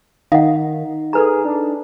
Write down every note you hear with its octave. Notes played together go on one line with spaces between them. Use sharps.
D#3 D#4 F5 F#5
G#4 A4 B4 A#5
D4